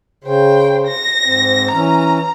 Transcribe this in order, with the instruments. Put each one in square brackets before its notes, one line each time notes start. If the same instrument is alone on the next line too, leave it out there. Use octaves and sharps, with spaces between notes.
[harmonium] C#3 [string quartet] C5 G5
[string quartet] A#6
[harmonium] G#2 C4
[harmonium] E3 C#4 [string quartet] A#5